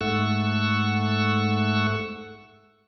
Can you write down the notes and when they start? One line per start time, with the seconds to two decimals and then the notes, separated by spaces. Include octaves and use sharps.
0.01 G#2 A3 F#5 C#6 E6